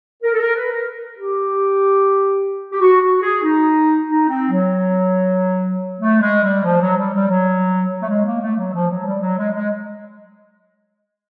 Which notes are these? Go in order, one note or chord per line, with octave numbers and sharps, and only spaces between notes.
A#4
A4
A#4
B4
A#4
G4
G4
F#4
F#4
G#4
D#4
D#4
C4
F#3
A3
G#3
G3
F3
F#3
G3
G3
F#3
F#3
A3
G#3
A#3
A3
F#3
F3
F#3
G3
F#3
G#3
G#3